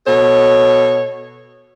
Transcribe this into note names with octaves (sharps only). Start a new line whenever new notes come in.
B2 A4 C#5